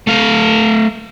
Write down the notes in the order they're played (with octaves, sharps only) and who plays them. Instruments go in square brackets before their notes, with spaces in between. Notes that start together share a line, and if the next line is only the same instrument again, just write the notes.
[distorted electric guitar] A3 F5